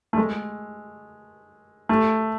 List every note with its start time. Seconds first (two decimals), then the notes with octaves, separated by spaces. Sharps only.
0.13 A3
0.17 G#3
1.89 A3